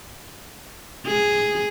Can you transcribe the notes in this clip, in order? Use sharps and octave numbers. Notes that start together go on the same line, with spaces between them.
G#4